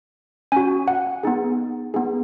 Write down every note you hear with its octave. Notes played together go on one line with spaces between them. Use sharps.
C#4 F#4 G#5
F#5
B3 D#4 G#4
B3 D#4 G#4